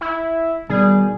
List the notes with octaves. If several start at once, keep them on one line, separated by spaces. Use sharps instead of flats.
E4
B2 D#3 G3 G#4